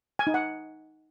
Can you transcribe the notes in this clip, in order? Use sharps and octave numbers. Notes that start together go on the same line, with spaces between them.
G#5
D#4
F#5